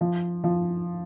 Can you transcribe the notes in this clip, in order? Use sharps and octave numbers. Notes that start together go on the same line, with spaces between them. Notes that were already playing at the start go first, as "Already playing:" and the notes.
F3
F3